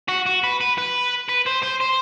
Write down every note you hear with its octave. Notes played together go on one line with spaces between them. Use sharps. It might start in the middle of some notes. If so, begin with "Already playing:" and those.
F#4
F#4
B4
B4
B4
B4
C5
C5
C5